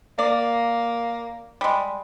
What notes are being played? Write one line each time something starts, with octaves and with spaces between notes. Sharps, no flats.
A#3 D5
G3 G#3